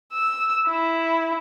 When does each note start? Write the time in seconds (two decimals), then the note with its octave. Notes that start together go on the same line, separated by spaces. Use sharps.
0.13 E6
0.68 E4